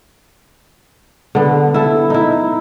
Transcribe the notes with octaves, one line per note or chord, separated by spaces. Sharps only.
D3 B3
E4 A4
D#4 E4